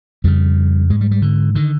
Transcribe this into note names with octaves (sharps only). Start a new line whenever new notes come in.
F2 C#3 G3
G#2 G#3
G3
G3
D3
D3 D#3